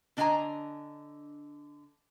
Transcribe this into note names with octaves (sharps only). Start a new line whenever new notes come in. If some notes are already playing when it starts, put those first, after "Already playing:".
D3 D4 D#5 F5 G#5 A#5